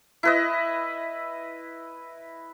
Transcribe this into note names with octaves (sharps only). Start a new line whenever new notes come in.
E4 B4 D#5